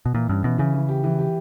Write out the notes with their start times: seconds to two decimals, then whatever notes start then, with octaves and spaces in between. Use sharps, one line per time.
0.06 B2
0.14 A#2 E3
0.29 G2 C#4
0.44 B2 E3
0.58 C#3 E3
0.74 E3
0.89 G4
1.04 E3
1.19 G4